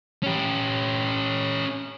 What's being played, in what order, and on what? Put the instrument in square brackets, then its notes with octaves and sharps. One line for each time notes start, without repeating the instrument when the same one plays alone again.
[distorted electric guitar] C#4 G4